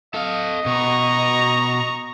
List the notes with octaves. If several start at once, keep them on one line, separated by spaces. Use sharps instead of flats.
A4 D#5 F5
B2 A#5 C#6